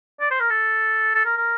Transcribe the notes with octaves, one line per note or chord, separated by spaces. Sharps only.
D5
C5
A#4
A4
A4
A#4
A#4